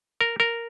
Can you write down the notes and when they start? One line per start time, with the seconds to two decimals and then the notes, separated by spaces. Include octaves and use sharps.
0.21 A#4
0.40 A#4